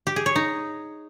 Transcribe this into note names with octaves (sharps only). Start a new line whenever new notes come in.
G4
G#4
C#5
D#4